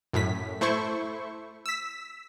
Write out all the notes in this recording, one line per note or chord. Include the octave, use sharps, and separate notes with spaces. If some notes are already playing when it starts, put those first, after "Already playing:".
F#2 A2 B6
A3 E4 C5 C#6
E6 B6